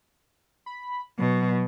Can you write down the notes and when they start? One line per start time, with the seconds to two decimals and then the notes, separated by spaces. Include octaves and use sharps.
0.66 B5
1.19 B2 F#3